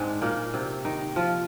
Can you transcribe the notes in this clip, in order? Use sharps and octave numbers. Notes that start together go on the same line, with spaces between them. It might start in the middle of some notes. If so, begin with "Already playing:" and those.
Already playing: G#2 G#3 C4 D4
A#2 A#3
C3 C4
D#3 D#4
F3 F4